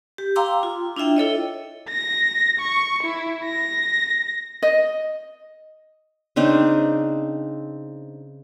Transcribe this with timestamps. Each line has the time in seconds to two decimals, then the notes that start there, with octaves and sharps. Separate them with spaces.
0.18 G4
0.36 F5 G5 A#5 C6 D6 E6
0.63 F4
0.96 D4 E4 F4 E5 G5
1.17 E4 A4 C#5 D#5
1.89 A#6
2.60 C#6
3.04 E4
3.45 A#6
4.63 D#5
6.36 C#3 C4 D4 D#4